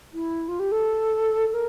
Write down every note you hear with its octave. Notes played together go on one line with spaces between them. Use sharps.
E4
F4
G4
A4
A#4